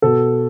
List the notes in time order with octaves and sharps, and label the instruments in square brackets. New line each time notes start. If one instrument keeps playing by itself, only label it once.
[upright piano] B2 A4